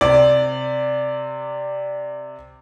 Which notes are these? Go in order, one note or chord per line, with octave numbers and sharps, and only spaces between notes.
C3 D5